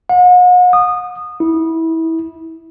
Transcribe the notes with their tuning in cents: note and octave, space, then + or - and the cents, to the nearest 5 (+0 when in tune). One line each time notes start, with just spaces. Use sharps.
F#5 -40
D#6 -20
E4 -25